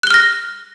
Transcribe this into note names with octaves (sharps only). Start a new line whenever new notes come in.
F6 F#6 A#6 G7